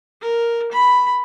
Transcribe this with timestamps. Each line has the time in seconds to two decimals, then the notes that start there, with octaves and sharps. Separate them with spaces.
0.22 A#4
0.72 B5